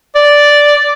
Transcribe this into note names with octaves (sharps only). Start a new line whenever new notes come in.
D5